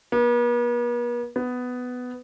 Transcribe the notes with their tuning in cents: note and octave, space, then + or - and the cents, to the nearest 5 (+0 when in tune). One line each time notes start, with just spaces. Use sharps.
B3 -45
B3 +10